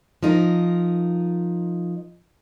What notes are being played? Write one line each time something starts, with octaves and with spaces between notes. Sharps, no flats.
F3 D#4 A#4